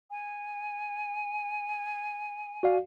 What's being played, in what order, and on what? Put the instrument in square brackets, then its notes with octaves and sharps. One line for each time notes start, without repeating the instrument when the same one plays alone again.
[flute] G#5
[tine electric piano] F#4 D5 F5